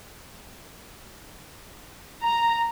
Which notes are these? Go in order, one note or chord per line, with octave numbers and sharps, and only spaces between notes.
A#5